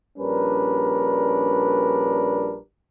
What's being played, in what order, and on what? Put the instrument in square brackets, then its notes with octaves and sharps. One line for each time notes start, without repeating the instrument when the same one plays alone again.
[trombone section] A#1 G3 C#4 D4 A#4 B4